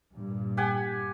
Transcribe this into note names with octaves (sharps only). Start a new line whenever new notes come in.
G2 A#2
G4 F#5 G#5